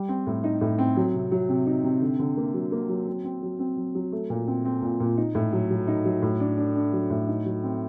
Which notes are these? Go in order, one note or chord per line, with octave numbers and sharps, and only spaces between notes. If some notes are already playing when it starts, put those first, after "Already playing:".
Already playing: G3
C4
A2
D#4
A2
C4
F#3
C3
F#3
C3
D#4
C3
D3
D3
A#3
F#3
A#3
F#3
C4
C4
F#3
C4
F#3
F#3
A3
A#2
C4
C4
A#2
A#2
D#4
A2
F#3
F#3
D#4
F#3
A2
D4
D4
D4
F#3
A2
D#4
F#3
C4